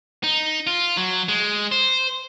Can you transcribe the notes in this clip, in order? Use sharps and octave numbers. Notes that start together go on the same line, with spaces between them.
D#4
F4
F#3
G#3
C5